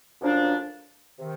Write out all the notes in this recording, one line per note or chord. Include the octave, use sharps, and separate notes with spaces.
F#2 D3 F3 A#3 D4
C3 D#3